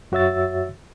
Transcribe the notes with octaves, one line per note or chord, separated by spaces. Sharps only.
F#2 F#4 C#5 E5 E6 A6